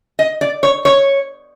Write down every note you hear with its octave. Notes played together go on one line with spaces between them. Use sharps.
D#5
D5
C#5
C#5